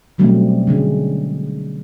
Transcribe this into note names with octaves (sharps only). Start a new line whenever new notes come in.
B2 F#3 G3 A3 C4 C#4
D3 G#3 C#4